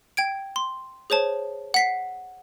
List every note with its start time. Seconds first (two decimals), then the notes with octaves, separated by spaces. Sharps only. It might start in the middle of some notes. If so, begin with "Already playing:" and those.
0.17 G5 G#6 D7
0.56 C6
1.10 G#4 C5 C#5 A5
1.74 F#5 B6 C7